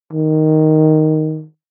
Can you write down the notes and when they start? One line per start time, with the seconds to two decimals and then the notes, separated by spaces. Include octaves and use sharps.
0.13 D#3